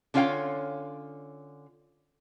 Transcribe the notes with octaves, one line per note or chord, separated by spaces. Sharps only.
D3 C#4 F4 C#5 F5 G5